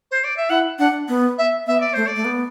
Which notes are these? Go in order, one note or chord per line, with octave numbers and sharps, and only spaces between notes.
C5
D5
E5
E4 F#5
D4 F#5
B3
E5
B3 E5
D5
A3 C5
D5
A3
B3